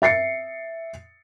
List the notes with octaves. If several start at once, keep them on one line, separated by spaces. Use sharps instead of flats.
E5 A6 C7 C#7